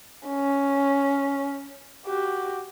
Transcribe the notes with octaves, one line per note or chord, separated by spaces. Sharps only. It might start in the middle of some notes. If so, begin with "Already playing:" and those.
C#4
F#4 G4